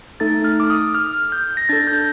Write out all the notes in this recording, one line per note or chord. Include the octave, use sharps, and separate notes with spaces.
A3 D#4 A4 A6
F6
D6
D#6
F6
G6
A#6
D4 A4 A6
G6